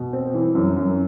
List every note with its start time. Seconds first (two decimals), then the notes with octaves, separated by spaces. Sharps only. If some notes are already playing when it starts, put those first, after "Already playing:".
Already playing: B2
0.13 C4
0.34 E3
0.55 F#2
0.76 F#2